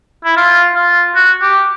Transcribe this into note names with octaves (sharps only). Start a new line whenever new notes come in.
E4
F4
F4
F#4
G4